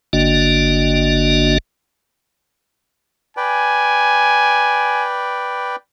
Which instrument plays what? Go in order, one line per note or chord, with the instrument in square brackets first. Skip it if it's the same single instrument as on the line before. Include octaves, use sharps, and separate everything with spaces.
[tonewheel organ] G1 D3 A#3 D4 F#4 D#5
[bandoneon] B4 D5 G5 [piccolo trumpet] G#5